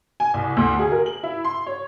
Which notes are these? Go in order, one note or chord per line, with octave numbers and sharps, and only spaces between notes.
G#5
C2
D2
G#4
A#4
F#7
E4
C6
C#5